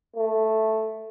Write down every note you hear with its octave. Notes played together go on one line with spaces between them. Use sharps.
A3